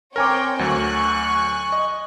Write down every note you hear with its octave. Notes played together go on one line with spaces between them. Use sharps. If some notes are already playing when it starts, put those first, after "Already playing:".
C4 A#4 C#5 G5 G#5 D6
D2 F#3 G#5 C#6 F#6
D#5